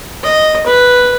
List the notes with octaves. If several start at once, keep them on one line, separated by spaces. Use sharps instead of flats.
D#5
B4